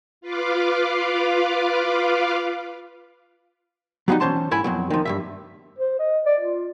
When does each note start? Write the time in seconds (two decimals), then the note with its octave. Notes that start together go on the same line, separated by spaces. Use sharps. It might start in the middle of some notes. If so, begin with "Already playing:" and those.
0.21 F4 B4 F5 D6
4.08 F#3 G3 B3 C#4 D#4
4.20 E3 C#4 C5 A5 C6
4.51 G#2 E4 G#5 B5
4.64 F2 B2 F#3
4.90 D#3 F3
5.05 G2 B2 E5
5.78 C5
5.99 D#5
6.25 D5
6.40 F4